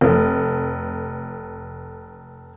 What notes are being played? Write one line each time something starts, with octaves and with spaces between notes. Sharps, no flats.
F1 A3